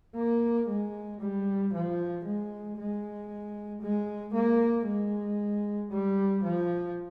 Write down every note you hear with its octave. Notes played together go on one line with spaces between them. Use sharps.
A#3
G#3
G3
F3
G#3
G#3
G#3
A#3
G#3
G3
F3